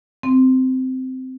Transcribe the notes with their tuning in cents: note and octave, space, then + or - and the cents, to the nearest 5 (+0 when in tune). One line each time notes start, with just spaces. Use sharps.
C4 -15